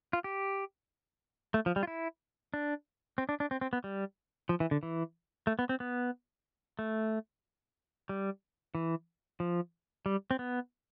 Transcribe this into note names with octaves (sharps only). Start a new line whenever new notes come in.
F4
G4
A3
F3
G3
F4
E4
D4
C4
D4
D4
C4
C4
B3
G3
F3
E3
D3
E3
A3
B3
C4
B3
A3
G3
E3
F3
G3
C4
B3